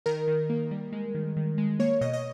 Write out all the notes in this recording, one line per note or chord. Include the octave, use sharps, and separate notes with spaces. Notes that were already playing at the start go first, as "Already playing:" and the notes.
D#3 A#4
D#3
A#3
G3
G#3
D#3
D#3
G#3
A#3 C#5
B2 D#5
D#5